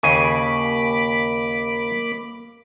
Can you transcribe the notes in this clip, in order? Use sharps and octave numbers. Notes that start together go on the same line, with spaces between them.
D#2 C#3 A#3 G#5 B5 D6